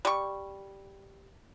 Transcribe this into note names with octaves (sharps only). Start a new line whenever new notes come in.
G3 C#6